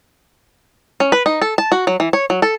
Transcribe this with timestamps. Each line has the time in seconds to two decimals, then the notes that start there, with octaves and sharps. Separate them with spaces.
1.00 C#4
1.12 B4
1.26 D#4
1.42 A4
1.58 A5
1.72 F#4
1.87 F#3
2.00 E3
2.13 C#5
2.30 F#3
2.42 A4